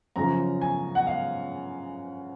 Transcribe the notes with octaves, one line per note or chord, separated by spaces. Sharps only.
F#2 C#3 F3 A#5
G#5
F#5
F5